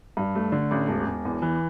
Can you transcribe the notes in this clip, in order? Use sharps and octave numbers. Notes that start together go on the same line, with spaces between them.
G2
A3
D3
A1
E1
E1
E2
E3